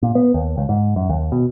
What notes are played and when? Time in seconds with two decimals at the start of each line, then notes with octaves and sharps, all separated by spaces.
0.03 A#2
0.15 B3
0.34 D#2
0.58 C#2
0.69 G#2
0.96 F#2
1.10 D#2
1.32 B2